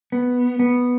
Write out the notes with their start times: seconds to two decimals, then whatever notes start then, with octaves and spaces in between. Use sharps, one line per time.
0.12 B3
0.59 B3